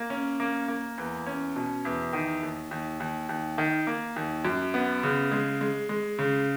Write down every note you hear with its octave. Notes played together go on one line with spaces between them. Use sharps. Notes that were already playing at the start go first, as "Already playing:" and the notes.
Already playing: A#3
C#4
A#3
A#3
E2
C#4
B2
E2
D#3
D#2
D#2
D#2
D#2
D#3
A#3
D#2
F#2
B3
C#3
G#3
G#3
G#3
C#3